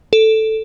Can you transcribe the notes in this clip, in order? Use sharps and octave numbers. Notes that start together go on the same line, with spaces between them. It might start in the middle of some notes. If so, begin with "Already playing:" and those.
A4